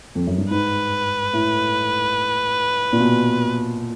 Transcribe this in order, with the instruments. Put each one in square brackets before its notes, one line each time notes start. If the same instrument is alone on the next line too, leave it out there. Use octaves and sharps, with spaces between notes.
[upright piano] F2
F#2
G2
[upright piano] G#2 [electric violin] B4
[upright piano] A2
A#2
B2